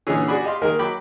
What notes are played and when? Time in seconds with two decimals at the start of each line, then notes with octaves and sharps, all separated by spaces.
0.07 A#2 D3 E3 G#3 C#4 G#4
0.28 F#4 G#4 D5 B5 D6
0.44 G4 D#5 F5 C6
0.62 D#3 G#3 A#3 A#4
0.79 F#3 G5 B5 D6